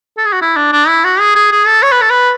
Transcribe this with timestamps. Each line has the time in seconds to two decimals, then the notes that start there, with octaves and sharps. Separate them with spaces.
0.18 A4
0.25 G#4
0.33 F#4
0.42 E4
0.57 D4
0.73 D4
0.88 E4
1.04 F#4
1.20 G#4
1.35 G#4
1.52 G#4
1.67 A4
1.83 C#5
1.92 B4
2.01 A4
2.10 B4